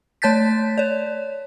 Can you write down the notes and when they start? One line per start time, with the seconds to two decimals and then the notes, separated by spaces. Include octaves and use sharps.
0.22 A3 C#5 A5 G6 A6 B6
0.78 C#5 D5